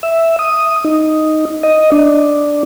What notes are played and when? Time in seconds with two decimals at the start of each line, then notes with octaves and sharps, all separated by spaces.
0.03 E5
0.39 D#6
0.84 D#4
1.63 D#5
1.92 D4